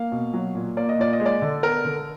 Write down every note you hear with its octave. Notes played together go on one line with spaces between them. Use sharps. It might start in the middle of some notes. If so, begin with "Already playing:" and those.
Already playing: A#3 F5
B2
F#3
A#2
A#3 D5
D#5
A#2 D5
D#5
G#3
D5
D3
B3 A#4
D3